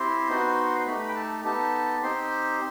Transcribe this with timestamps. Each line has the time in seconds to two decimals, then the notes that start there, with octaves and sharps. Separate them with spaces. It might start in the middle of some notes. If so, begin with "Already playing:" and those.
Already playing: C4 E4 G4 C5 C6
0.29 B3 D#4 F#4
0.87 A3 D#4 G4 B4 B5
1.09 G5
1.15 A4 A5
1.44 B3 D#4 G4 A4 A5
2.03 C4 D#4 G4 C5 C6